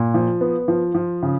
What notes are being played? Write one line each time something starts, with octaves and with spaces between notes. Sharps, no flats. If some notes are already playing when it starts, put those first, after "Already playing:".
Already playing: A#2
F3
B3
F3
F3
C#3